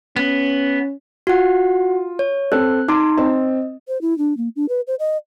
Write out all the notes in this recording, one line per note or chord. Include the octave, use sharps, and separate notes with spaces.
B3 C#4
F4 F#4 F#5
C#5
C4 A4 F#6
D#4 A#5 C6 D6
C4 D#5
C5
E4
D4
A#3
D4
B4
C5
D#5